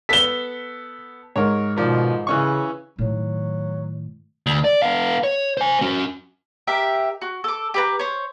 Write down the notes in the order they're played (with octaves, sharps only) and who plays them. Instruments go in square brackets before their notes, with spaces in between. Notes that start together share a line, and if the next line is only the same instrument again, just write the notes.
[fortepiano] B3 A4 [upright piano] B6 G7
[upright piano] G#2 [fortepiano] A#4 C#5
[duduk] B2 [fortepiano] D#3 F3 D5
[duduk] C#3 [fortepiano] E3 C#4 C#6
[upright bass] A2 D#3 [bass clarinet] F#3
[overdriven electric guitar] D2
D5
B3 F5
C#5
C5 G#5
C#4 F#4
[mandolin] G4 A#4 E5
F#4
A4 D6
G4 B4 A#5
C5 C#5